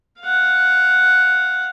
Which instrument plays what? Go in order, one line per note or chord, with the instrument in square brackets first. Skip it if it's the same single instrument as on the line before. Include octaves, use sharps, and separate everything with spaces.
[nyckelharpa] F5 F#5